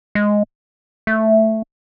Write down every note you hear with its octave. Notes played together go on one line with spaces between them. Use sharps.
G#3
A3